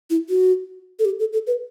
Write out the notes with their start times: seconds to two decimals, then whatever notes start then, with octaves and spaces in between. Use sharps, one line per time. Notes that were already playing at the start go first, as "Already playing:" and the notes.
0.10 E4
0.29 F#4
0.99 A4
1.05 G4
1.20 A4
1.33 A4
1.47 B4